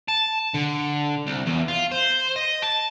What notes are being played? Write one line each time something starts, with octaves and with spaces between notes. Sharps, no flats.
A5
D3
C2
E2
F4
C5
D#5
A5